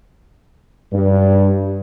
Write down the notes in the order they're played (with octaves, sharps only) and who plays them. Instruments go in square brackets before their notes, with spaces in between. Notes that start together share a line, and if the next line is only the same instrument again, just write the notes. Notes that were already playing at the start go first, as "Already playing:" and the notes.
[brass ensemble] G2